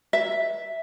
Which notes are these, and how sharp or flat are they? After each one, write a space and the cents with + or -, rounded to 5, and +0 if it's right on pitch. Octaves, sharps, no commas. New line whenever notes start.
E5 +0